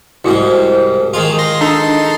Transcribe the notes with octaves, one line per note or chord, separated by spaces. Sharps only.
C2 G#2 G3 E4 F#4
D#3 G#3 F4
C6 A#6
D4 D#4 A4 C6